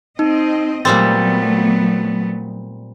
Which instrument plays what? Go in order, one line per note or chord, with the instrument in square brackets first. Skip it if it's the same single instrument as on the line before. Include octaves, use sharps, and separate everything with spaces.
[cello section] C4 D#5 [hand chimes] D#4
[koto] A#2 G3 C4 [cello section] F#3 A3 B3 [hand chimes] A6